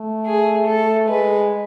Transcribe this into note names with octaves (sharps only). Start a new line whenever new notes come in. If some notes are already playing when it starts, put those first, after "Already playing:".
Already playing: A3
G#4
A4
G#3 B4